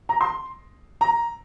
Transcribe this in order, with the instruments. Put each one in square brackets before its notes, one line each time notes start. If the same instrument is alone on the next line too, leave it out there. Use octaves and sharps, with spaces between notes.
[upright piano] A#5
C6
A#5